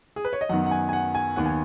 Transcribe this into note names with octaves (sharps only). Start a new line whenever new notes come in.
G#4
B4
C#5
D#5
F#2 D#3 B3 F#5
F#5
G#5
G#5
F#5
G#5
D#2 D#3 B3 F#5
G#5